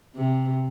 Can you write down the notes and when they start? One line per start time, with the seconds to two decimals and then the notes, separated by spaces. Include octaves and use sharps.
0.16 C3